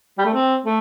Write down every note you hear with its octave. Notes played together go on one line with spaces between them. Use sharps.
G3
A3
C4
A3